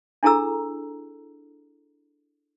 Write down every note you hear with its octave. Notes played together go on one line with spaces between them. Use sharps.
D4 E4 G#4 A4 A#5 E6